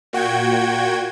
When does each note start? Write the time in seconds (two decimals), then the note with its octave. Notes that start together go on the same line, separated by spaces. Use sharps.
0.13 A#2 F#4 G5 G#6